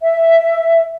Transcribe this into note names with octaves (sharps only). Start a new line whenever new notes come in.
E5